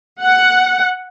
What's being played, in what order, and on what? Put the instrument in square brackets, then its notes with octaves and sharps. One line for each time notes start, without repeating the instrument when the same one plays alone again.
[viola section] F#5